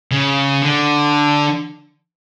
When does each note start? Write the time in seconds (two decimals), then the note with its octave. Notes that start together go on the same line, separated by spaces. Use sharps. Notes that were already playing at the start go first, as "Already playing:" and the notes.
0.11 C#3
0.62 D3